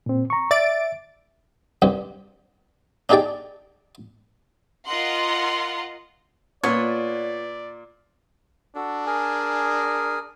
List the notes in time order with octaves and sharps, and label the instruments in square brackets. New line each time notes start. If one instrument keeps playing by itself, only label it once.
[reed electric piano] A#2 C4
A#5 C#6
[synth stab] D5 A6 D7 [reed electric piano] E5
[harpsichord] C2 G2 G4
D4 D#4 G4 G#4 D5 G5
[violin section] F4 A#4 D#5 F#5 C6
[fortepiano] A#2 [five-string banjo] B3 F4 B4 [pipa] C#5 [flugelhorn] D5
[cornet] D4 [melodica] F#4 A4
[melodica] G#4 A#4 G#5